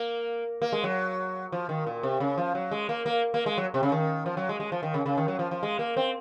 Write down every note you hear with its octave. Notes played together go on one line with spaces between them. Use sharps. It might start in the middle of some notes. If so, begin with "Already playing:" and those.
Already playing: A#3
A#3
G#3
F#3
F3
D#3
A#2
C3
C#3
F3
F#3
G#3
A#3
A#3
A#3
G#3
F#3
C3
C#3
D#3
F3
F#3
G#3
G#3
F3
D#3
C#3
C#3
D#3
F#3
F3
F3
G#3
A#3
C4